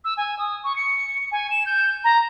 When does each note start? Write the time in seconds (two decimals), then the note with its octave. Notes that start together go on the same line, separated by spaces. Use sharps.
0.04 E6
0.17 G#5
0.39 D#6
0.64 C#6
0.76 C#7
1.32 G#5
1.50 E7
1.66 G6
2.04 A#5